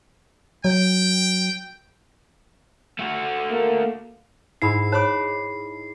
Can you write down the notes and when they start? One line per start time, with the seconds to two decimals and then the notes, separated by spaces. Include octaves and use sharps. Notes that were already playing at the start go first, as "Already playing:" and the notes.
0.65 F#3 G5
2.99 A3 F#4
3.51 A#3
4.62 G#2 D#4 E4 B5 C7
4.92 C5 C#5 A5 B5 D6